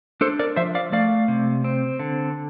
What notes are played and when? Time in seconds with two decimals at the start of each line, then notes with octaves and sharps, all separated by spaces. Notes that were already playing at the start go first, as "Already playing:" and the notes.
0.21 D4 A4 C5
0.39 A#4 D5
0.56 F3 C5 E5
0.75 D5 F5
0.92 A3 D5 F5
1.28 C3
1.64 C4
1.99 D3